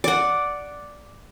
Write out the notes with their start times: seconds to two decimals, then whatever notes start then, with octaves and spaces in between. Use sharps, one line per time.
0.04 D5 F#5